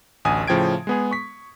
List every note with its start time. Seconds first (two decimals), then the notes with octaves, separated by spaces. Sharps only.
0.25 A1 D2 G#5 D#6
0.48 A2 C#3 F3 G5 G#6 D7
0.87 G#3 B3 G#4
1.11 C#6 B6